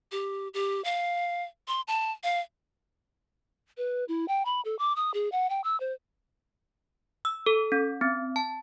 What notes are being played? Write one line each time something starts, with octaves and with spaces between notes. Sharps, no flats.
G4
G4
F5
C6
A5
F5
B4
E4
G5
B5
A4
D6
D#6
G#4
F#5
G5
E6
C5
E6
A4
C#4
C4
A5